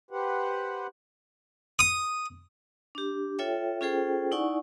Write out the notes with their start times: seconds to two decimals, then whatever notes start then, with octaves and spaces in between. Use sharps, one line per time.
0.11 G4 B4 C5 F#5
1.79 D#6
2.95 D4 G4
3.39 F4 A4 C#5 E5 G5
3.81 C#4 F4 G#4 A4 C5 G5
4.32 D#4 E4 D5 F#5 G#5 C#6